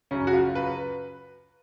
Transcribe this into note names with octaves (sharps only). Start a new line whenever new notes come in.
F#2 C#3 C#4
F#4
F4
B4